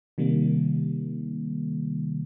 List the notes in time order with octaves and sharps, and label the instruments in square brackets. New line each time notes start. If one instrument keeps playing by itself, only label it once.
[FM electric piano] C3 D#3 G3 A#3